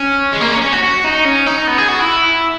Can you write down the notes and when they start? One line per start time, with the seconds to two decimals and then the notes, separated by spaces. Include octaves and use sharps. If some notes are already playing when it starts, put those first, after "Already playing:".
Already playing: C#4
0.33 G#3
0.41 A#3
0.51 C#4
0.62 C#4
0.73 F#4
0.83 F#4
1.05 D#4
1.25 C#4
1.46 D#4
1.67 B3
1.78 G#4
1.88 F#4
2.00 E4